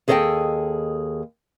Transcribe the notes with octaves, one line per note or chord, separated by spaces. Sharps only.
D#2 G#4 A4 D5 D#5 G5